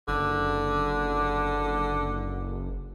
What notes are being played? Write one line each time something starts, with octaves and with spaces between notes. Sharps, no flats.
F#1 D3